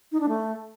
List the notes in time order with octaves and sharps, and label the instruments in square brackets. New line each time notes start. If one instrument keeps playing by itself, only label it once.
[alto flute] D#4
D4
A3